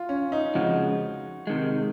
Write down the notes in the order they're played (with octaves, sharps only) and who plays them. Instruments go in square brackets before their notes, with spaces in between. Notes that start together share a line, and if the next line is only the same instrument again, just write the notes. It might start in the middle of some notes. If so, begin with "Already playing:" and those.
Already playing: [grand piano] F4
C#4
D#4
[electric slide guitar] F2 C#3 F3 G#3 [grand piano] F#4
[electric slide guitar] C3 D#3 G#3